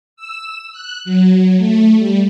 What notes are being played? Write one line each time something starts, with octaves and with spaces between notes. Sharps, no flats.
E6
F#6
F#3
A3
G3